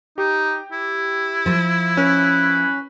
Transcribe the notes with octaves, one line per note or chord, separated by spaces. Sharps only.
D#4 G4
E4
F3
C#4 B4